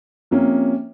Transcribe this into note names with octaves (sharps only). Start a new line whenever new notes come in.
C3 F3 A#3 C#4